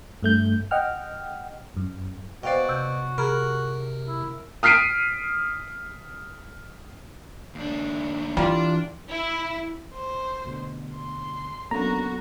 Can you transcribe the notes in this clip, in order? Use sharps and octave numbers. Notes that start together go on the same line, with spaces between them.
G2 A3 G6
D#5 F#5 G5 F6
F#2
B2 F#4 C5 D5 F5 G5
C3 G6
C3 G#4 A#4 A#5 B5
E4
D#6 F6 B6 C7 D7 D#7
D#2 D4
E3 G3 A#3 D4 F4
E4
C5
D2 B2 D3
C6
F#3 A#3 B3 C#4 D4 F#4 A4 A#5